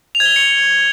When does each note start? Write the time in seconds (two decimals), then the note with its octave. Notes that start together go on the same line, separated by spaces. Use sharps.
0.15 F7
0.20 G#6
0.25 G7
0.31 F7
0.36 C#7